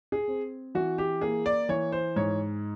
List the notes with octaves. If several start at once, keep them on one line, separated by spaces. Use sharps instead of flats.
G#4
C4
E3 F#4
G4
A#3 G#4
D5
E3 C#5
C5
G#2 C#5